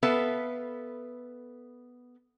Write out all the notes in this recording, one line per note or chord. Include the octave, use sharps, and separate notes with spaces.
B3 A4 B4 E5 F5